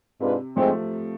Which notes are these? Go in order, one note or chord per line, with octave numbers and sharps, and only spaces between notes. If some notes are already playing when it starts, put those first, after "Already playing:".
G#2 C3 G#3 D4 F4 B4
G#2 F3 G#3 A3 C4